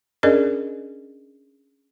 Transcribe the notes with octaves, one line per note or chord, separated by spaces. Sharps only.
C#4 D4 G#4 A#4 D5 D#5